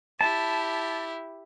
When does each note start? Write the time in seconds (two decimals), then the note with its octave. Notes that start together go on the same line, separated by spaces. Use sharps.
0.21 E4 G4 A5